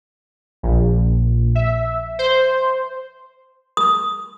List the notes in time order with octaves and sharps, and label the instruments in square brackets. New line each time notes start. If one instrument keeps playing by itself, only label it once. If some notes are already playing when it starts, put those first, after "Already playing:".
[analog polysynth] A#1
E5
C5
[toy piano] D#6